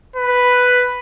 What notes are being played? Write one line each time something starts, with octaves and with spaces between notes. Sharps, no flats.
B4